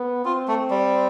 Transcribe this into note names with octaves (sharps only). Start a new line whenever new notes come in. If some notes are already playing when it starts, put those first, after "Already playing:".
Already playing: B3
C4 F4
A3
G3